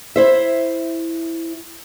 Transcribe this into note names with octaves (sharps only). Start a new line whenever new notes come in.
E4 C5 E5